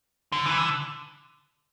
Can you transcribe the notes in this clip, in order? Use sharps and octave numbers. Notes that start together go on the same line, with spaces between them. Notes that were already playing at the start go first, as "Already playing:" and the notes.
D3
E3
D3